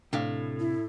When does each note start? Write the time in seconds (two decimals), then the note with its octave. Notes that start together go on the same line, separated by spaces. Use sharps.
0.13 A2 C3 D4 F5
0.60 E4